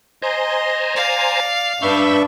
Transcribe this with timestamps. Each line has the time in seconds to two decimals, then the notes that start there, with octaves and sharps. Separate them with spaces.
0.22 C5 D#5 G#5 A#5 C6
0.96 D5 F5
1.82 G2 D4 B4 E5 B5 C#6 E6 G6